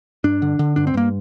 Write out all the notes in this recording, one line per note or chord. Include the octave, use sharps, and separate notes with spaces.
G2 D4
D3
D3
G2 D4
C4
G2 A#3